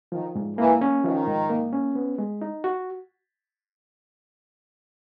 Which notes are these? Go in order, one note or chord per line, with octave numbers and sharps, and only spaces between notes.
D#3 F3
G#2
E3 A#3
C#4
D#3 F3
G#2
A#3
C#4
B3
G#3
D#4
F#4